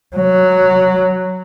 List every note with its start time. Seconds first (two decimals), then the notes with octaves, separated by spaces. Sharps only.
0.16 F#3